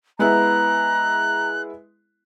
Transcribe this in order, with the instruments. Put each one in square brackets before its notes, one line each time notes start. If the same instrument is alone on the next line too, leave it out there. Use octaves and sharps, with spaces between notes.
[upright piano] G#3 B3 E4 [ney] A#5 [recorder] F#6